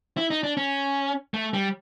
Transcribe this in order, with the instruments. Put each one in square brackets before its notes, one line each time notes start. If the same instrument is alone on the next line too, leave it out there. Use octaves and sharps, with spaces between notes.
[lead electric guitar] E4
D#4
D4
C#4
A3
G3